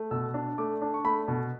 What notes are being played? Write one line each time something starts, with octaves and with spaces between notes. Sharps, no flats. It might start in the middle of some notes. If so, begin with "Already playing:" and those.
Already playing: A3
B2 E6
D4
A3 D6
D4
C#6
A3 B5
B2